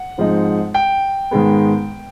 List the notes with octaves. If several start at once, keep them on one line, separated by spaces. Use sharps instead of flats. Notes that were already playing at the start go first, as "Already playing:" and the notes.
Already playing: F#5
G#2 F3 G#3 C4 D#4
G5
G#2 D#3 G#3 B3